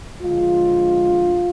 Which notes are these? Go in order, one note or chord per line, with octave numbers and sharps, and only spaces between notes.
D3 F3 G#3 F4